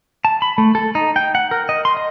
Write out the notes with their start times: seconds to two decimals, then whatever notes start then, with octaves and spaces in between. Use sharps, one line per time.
0.25 A5
0.42 B5
0.58 A3
0.75 A4
0.95 D#4
1.16 G5
1.35 F#5
1.51 A#4
1.69 D#5
1.85 C6
1.97 D#5